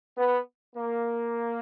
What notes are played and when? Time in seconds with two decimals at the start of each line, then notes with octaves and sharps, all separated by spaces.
0.17 B3
0.76 A#3